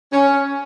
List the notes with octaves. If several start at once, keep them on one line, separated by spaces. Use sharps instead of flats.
C#4